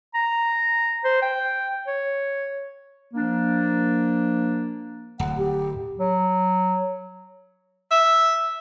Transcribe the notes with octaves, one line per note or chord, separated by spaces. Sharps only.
A#5
C5
G5
C#5
F3 A#3 D4
D1 F#5
G4
F#3
E5